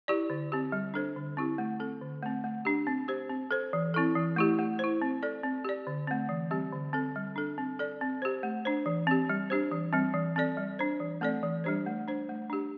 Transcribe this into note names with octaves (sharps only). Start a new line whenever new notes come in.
E4 G4 D5
D3
C4 G4
G3
D4 A4 C5
D3
C4 E4 G4
A3
C4 A4
D3
A3 C4
A3
D4 G4
C4
G4 C5
C4
A4 C5
E3
C4 E4 A4
E3
A3 E4 G4
A3
E4 C5
C4
A4 D5
C4
G4 D5
D3
A3 C4
E3
G3 C4 G4
D3
C4 A4
G3
D4 A4
C4
A4 D5
C4
G4 C5
A3
D4 C5
E3
C4 G4
G3
D4 G4 C5
E3
G3 C4
E3
C4 A4 D5
G3
D4 C5
E3
A3 C4 A4 D5
E3
G3 D4 G4 C5
A3
D4 C5
A3
D4 G4